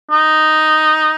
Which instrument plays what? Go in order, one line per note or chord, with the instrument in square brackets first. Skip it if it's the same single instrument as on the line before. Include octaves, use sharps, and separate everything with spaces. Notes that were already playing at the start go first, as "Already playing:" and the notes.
[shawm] D#4